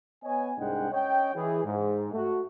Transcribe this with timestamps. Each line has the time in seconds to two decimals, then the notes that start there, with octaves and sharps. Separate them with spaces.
0.24 B3 C#5 D#5 G#5
0.58 C2 G#2 G#3 D4 F#5 G5
0.92 C#4 C#5 D#5 G5
1.35 E3 G#4
1.65 G#2
2.13 A3 F#4